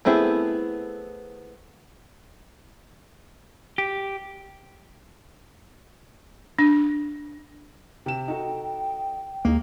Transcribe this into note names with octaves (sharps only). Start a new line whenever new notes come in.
A3 B3 C4 E4 G#4
G4
D4
C3 G5 E7
D#4 F#4 A4
D#2 G#3 A#3 D#4